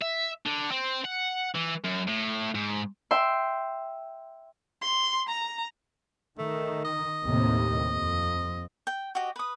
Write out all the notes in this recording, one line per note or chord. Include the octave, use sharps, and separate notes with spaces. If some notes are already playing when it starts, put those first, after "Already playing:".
E5
D3
C4
F#5
E3
F#2
A2
G#2
E5 G5 C6
C6
A#5
D#3 A3
D#5
D#2 A2 C3
F2
G5
F#4 G4 D#5
B4 D#6